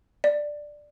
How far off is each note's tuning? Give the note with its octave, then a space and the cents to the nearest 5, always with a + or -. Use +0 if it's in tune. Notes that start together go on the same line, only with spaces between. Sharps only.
D5 +10